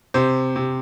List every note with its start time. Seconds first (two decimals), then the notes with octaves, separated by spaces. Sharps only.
0.14 C3 C5
0.56 C3